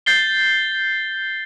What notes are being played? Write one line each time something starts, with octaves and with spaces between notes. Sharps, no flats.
G6 A6 C7 G7